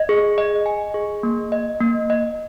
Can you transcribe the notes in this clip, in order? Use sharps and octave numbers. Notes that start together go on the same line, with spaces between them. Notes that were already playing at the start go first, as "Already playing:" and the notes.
Already playing: D#5
G#4
D#5
G#5
G#4
A#3
D#5
A#3
D#5